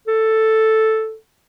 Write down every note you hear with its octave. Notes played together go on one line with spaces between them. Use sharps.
A4